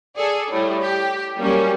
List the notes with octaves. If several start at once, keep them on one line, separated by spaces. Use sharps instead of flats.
G#4 A4 D5
A2 G3
G4
F#3 G3 A#3 C#4